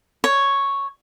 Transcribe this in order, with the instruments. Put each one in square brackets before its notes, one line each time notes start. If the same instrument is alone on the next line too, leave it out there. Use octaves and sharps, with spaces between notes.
[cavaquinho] C#5